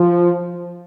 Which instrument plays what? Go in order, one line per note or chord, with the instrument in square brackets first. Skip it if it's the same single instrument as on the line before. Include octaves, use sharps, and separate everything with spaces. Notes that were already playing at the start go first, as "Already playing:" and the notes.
Already playing: [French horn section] F3